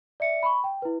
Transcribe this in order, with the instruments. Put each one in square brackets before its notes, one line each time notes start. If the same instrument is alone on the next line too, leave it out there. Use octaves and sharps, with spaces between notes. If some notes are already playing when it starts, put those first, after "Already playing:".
[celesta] D5 E5 C#7
B5 C#6
G5
E4 B4